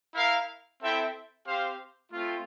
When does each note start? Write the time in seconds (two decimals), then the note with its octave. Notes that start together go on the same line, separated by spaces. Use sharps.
0.13 E4 A#4 F5
0.79 C4 E4 A4 E5 G5
1.46 C4 G4 C5 F5
2.12 A3 C4 F4